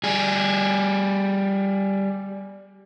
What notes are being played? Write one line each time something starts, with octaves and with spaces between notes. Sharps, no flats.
G3 G#4